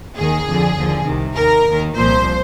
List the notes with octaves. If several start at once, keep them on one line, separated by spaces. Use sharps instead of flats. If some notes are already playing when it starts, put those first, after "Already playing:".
D#2 D#3 G#4
F2 D3 F3
D#2 D3 F3
C2 C3 D#3
D#2 D#3 A#4
D#2 D#3
C2 A#2 F3 C5